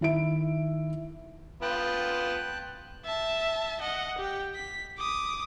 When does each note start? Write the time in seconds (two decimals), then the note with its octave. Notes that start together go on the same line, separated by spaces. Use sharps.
0.01 D#3 E4 E5 D7
1.62 B3 F4 G5 A5 F#6
3.05 E5 A5
3.81 D#5 F#5
4.18 G4 G5
4.54 B6
4.98 D6 D#6